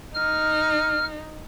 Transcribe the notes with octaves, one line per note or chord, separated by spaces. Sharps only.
D#4 F6